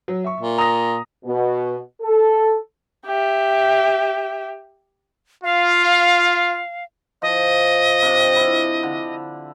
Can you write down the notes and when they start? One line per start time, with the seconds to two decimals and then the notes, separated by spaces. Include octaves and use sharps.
0.08 F#3
0.24 E5 C#6
0.40 A#2
0.58 A#5 D#6 A#6
1.25 B2
2.01 A4
3.06 G4 E5
5.43 F4 F5
7.22 F3 D#5
8.02 C3 D4
8.36 E4
8.83 D3